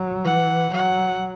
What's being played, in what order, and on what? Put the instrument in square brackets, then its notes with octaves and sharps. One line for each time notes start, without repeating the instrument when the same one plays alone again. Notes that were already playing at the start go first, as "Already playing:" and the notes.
Already playing: [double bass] F#3
[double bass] E3 [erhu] F#5
[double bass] F#3 [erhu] F#5